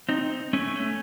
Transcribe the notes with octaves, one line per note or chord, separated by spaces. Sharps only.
C4 D#4
A3 C#4
A3 C#4